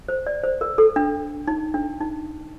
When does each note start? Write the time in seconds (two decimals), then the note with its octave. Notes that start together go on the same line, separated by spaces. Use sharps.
0.09 C5
0.27 D5
0.44 C5
0.61 A#4
0.78 A4
0.96 D4
1.47 D#4
1.74 D4
2.00 D#4